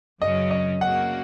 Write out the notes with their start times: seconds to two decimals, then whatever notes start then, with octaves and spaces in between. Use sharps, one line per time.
0.22 F#2 C#3 F#3 C#4 D#5
0.51 D#5
0.81 C#3 A#3 F#4 F#5